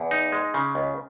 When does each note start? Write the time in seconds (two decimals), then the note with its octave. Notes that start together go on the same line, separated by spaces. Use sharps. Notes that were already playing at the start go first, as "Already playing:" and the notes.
Already playing: E2
0.11 D#4
0.32 G#3
0.54 C#3
0.75 C#2